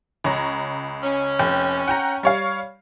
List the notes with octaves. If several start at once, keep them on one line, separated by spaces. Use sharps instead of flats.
C#2 C#5 A#5
C#4
F1 G5
F#5 G5 A#5
G3 C#5 F5